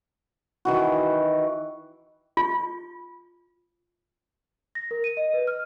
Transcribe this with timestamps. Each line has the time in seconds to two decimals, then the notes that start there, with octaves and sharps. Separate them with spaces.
0.65 D#3 E3 F#4
2.37 F4
4.75 A#6
4.91 A#4
5.04 D#7
5.17 D#5
5.34 B4
5.47 F6